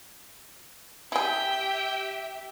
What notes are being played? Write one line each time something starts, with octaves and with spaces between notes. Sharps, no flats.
E4 G4 G#4 E5 G5